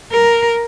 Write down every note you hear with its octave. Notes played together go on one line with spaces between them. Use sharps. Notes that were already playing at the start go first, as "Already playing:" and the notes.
A#4